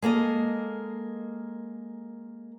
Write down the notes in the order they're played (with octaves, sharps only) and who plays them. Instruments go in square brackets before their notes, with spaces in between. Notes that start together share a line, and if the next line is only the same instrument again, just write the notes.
[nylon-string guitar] G#3 A#3 A4 D#5